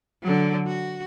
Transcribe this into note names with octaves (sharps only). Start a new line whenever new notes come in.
D3 F#3
F#4